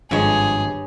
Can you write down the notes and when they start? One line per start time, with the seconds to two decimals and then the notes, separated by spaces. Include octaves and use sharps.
0.11 G#1 G2 F3 G#3 G#4 C#5